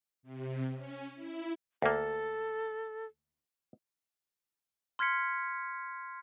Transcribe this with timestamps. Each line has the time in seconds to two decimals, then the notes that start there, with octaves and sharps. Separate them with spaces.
0.23 C3
0.74 C#4
1.15 E4
1.82 D2 A#3 A4
4.99 C6 F6 G#6 B6 C#7